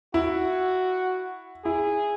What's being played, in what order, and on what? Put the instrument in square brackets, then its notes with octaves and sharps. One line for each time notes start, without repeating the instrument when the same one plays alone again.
[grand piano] E4 [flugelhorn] F#4
[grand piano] E4 [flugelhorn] G#4